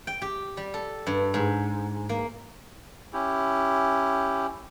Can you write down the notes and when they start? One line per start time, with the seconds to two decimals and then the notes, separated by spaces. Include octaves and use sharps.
0.07 G5
0.22 G4
0.57 G3
0.74 A4
1.07 G2
1.34 G#2
2.09 A#3
3.13 C#4 E4 G4